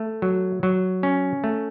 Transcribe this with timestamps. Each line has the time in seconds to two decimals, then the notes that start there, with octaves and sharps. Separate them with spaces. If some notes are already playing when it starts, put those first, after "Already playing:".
Already playing: A3
0.22 F#3
0.63 F#3
1.03 C#4
1.44 A3